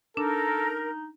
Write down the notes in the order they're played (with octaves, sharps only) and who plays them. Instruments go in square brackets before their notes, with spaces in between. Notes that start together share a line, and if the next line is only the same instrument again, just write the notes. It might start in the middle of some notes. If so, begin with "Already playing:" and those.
[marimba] D4 [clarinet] D#4 [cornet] A4 [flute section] A#4